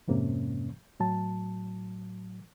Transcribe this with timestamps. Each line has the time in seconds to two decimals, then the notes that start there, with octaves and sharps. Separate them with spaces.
0.08 F2 G#2 C3 A#3 C#4
1.00 A2 F#3 A5